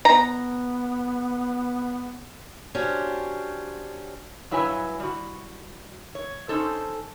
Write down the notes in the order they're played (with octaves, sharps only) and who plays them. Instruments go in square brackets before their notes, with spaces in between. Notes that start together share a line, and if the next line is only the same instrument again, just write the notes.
[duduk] B3 [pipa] A#5
[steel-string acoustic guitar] C#4 D4 F#4 G4 C5
[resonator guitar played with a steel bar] G2 F#3 E4 B4 C#5 G#5
G3 F#4
C#5
C#4 D#4 A4 C5